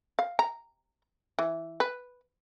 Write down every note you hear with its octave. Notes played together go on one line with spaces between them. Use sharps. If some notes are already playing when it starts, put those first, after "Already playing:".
F5
A#5
E3
B4